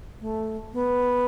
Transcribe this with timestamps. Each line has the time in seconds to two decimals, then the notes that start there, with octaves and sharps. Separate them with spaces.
0.21 A3
0.73 B3